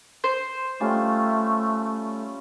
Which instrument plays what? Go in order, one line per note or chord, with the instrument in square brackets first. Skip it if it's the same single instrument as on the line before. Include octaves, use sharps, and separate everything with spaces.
[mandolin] C5
[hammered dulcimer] G3 C#4 F4 [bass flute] A3